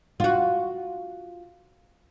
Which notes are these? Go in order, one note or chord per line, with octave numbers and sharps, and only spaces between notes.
F4 F#4